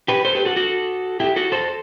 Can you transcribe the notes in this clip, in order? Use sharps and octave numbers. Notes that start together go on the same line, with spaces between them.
G4 B4
A4 C5
G4 B4
F#4 A4
F#4 A4
E4 G4
F#4 A4
A4 C5